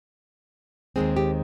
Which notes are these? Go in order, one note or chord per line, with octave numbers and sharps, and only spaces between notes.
D#2 D#3 G#3 C4 G#4
G4